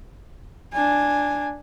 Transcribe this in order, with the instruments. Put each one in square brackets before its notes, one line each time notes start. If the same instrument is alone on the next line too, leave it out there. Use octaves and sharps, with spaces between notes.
[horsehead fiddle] D4 G#5